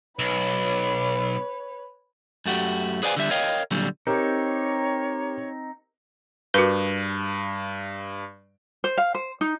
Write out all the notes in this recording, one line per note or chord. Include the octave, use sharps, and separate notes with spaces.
B1 B4 C#5
F#2 A3 F#4 G4
G#4 B4 C5 D5 F5 G#5
D3 G3 E5
A#4 C#5 D#5 F5 G5
A#2 D3 F#3 G3
C4 D#4 G4 A#4 C#5
G2 F#4 A#4 B4
C5
F5
C5
D#4